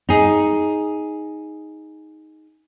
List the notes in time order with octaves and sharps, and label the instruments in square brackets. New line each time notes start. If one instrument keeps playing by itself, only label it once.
[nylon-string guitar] D#4 G#4